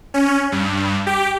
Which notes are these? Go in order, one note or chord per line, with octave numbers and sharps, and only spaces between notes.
C#4
G2
G4